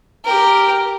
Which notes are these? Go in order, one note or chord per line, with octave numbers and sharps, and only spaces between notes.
G4 A#4